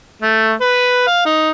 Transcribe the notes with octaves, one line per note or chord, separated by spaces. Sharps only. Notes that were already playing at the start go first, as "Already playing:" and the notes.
A3
B4
F5
D#4